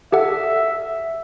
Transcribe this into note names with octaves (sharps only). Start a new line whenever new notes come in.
G4 A4 E5 F#5